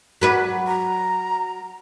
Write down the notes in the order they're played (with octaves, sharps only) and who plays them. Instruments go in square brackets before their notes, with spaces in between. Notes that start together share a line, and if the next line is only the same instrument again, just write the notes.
[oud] F#3 B4 D5
[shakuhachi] A#5